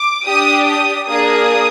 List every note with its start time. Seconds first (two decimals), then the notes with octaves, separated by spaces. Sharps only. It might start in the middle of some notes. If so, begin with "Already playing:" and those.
Already playing: D6
0.26 D4 G4 D#6
0.67 D#6
1.08 A#3 D4 G#4 D#6